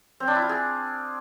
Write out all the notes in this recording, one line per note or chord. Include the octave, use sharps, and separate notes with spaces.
C4
D4
E4
F4
G#4